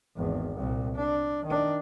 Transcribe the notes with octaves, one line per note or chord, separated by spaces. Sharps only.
G#1 E2
C2 A#2
D4
D#3 D4